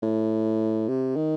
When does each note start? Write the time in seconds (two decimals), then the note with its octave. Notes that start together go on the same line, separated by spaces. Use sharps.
0.02 A2
0.88 C3
1.16 D#3